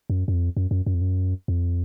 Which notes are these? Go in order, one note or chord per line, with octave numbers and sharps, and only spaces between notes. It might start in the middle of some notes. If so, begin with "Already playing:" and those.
F#2
F#2
F2
F#2
F#2
F#2
F2
F#2
F2